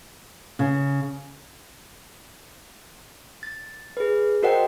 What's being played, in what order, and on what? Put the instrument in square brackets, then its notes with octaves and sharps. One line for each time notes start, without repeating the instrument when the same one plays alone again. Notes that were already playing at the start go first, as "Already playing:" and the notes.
[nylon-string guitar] C#3
[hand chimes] A6
G#4 B4
F#4 A#4 C5 D#5 F#5 G5